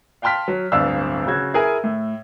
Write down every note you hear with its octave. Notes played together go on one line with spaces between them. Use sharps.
F5 G5 A5 C6 F6 B6
F#3
D1 G1 D4 F5 E6
C#3 F#4 G#6
E4 G#4 A#4 G#5
A2